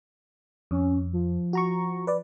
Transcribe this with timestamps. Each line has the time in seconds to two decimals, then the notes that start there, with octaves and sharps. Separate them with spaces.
0.71 F2 C#4
1.13 F3
1.53 F#4 A#5 C#6
2.07 B4 D5